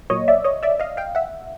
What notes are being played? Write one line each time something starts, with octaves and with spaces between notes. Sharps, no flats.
A#2 F#3 A#3 C#5 D#5
D5 E5
C#5 D#5
D5 E5
D#5 F5
F5 G5
E5 F#5